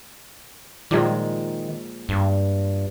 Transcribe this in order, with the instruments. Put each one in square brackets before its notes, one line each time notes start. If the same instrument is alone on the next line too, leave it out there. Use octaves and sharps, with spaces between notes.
[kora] A#2 F3 G#3 [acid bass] D#3
[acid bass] G2